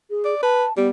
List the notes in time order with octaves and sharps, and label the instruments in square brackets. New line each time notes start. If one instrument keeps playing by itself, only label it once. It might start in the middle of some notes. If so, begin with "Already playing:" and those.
[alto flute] G#4
[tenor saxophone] D5
[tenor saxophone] B4 [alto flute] A5
[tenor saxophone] G3 [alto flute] B3